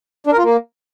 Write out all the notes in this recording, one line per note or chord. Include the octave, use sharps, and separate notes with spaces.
D4
A#4
F4
A#3